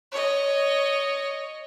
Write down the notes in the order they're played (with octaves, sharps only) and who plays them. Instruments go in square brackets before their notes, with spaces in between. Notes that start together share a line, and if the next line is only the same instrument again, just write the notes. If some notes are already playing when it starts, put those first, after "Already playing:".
[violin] C#5 D#5